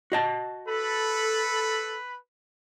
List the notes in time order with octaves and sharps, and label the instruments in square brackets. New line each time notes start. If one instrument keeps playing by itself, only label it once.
[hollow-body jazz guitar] F#4 D#5 A5
[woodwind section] A4 [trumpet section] B4 B5